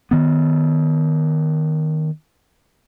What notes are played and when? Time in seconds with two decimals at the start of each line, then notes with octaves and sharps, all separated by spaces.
0.11 D#3 B3